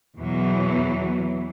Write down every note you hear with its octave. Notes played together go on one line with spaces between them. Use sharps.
E2 B2 E3 F#3